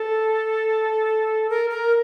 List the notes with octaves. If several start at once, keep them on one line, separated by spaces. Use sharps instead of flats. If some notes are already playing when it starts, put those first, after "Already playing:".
Already playing: A4
A#4
A#4